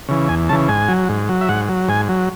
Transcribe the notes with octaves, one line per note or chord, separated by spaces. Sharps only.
C#3 E3
E2 G#5
C#3 E3 A5
G#2 G#5
F#3
G#2
F#3
E5
G#2 F#5
F#3
G#2 G#5
F#3